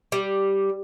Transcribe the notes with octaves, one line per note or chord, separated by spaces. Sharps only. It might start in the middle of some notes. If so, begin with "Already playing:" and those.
G3